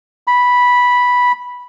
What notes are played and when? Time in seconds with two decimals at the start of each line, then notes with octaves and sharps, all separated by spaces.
0.27 B5